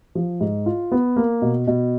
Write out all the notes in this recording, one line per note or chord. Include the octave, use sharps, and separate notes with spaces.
F3
G#2
F4
B3
A#3
B2
B2